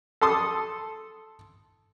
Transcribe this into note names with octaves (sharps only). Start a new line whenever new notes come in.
A4 A5 C6 D#6